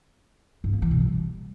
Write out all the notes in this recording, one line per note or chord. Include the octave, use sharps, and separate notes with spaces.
G2
A#3
E3
B2
G3